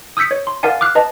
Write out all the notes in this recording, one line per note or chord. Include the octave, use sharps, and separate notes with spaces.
D#6 E6 G6 B6 C#7
C#5
C6
A#4 D5 F5 F#5 G#5
D6 F6 F#6 C7
B4 D#5 A5